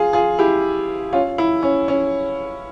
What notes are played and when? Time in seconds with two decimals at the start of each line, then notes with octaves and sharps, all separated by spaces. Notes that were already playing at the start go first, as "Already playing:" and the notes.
Already playing: F4 G#4
0.13 F4 G#4
0.39 E4 G4
1.13 C#4 F4
1.38 E4
1.63 C#4
1.88 C#4